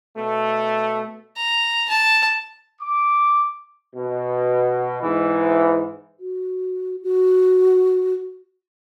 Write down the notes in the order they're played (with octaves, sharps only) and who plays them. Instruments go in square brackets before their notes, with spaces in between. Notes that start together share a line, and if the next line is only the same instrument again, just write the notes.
[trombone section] B2 A3
[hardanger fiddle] A#5
A5
[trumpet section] D6
[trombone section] B2
G#2 E3
[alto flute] F#4
F#4